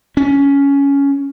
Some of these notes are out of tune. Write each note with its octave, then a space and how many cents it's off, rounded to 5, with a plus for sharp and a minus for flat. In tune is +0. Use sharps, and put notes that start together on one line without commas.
C#4 +10